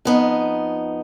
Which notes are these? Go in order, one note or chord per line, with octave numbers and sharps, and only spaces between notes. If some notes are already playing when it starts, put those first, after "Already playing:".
F2 B3 D#4